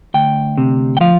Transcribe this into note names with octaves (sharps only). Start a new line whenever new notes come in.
D2 G5
C3
G5
F3 F5